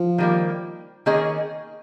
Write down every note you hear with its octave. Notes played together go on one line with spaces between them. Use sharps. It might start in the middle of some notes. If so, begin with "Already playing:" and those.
Already playing: F3
D#3 G3 A#3
D#3 A#3 C#4 G#4 D#5